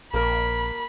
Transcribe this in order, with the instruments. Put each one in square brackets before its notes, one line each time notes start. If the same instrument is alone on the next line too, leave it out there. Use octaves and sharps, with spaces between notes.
[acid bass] A#1 [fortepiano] A#3 A#4 [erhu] B5